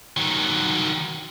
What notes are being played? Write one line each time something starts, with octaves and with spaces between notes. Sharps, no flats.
D#3 F#3